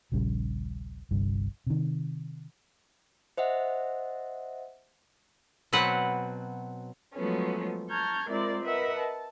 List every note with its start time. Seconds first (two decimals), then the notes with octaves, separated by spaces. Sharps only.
0.12 D#1 A#1 C#3 G3
1.11 G1 C2 G2
1.67 C3 D#3
3.37 C5 D#5 E5 F#5
5.73 B2 F#3 C4 B4 F#5
7.14 F3 F#3 G#3 A3 B3 C#4
7.90 A5 A#5 C#6 F6 G6 G#6
8.30 G#3 C4 E4 F4 A#4 D5
8.64 A#4 B4 D#5 E5 F#5 B5
8.97 A5